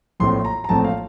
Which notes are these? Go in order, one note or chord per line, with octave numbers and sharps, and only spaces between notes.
A#1 A2 A3 C4 C6
A#5
A#5
A#1 A2 A3 C4 A5
F5